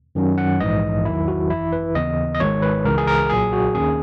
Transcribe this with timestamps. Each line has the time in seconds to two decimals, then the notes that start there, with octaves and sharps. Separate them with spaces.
0.15 F#2 D#3 F#3 C#4
0.38 F#5
0.60 A#1 G#2 E3 D#5
1.05 E2 D#3 F#3 E4
1.28 F#4
1.50 G#1 F#2 E3 E4
1.72 B4
1.95 D#2 C#3 E3 B3 D#5
2.35 D#5
2.40 G#1 G#2 D#3 G#3 C#5
2.62 B4
2.85 C#2 C#3 E3 A#4
2.98 G#4
3.08 A#4
3.30 B1 A#2 F#3 G#4
3.53 F#4
3.75 D#2 D#3 A#3 C#4 G#4